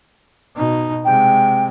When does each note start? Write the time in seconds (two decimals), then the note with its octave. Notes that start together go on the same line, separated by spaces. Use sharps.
0.57 B2 D#4
1.05 C3 G#3 G5